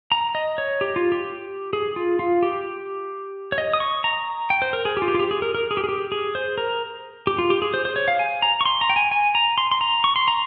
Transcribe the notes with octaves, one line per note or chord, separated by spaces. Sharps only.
A#5
D#5
C#5
G4
F4
G4
G#4
F4
F4
G4
C#5
D#5
D#6
C#6
A#5
G5
C5
A#4
G#4
G4
F4
G4
F4
G4
G#4
A#4
A#4
G#4
G4
G#4
G4
G#4
C5
A#4
G4
F4
G4
G#4
C5
C5
C#5
F5
G#5
A#5
C#6
C6
A#5
G5
G#5
G#5
A#5
C6
C6
A#5
C#6
C6
A#5